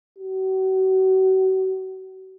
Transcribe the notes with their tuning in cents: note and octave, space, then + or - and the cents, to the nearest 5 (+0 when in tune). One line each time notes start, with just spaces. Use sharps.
F#4 +40